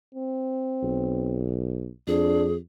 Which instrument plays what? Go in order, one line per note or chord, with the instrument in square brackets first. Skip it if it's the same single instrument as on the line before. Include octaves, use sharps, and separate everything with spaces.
[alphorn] C4
[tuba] B1
[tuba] F2 [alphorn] D4 [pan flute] G#4